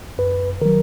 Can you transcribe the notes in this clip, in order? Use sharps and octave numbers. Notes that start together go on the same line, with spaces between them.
F#2 B4
D#3 F#3 A#4